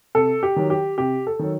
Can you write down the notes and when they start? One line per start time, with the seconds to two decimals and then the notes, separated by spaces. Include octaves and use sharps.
0.15 C3 A4
0.43 G4
0.56 D#3 F#3
0.70 G4
0.98 C3 G4
1.27 A4
1.39 D#3 F#3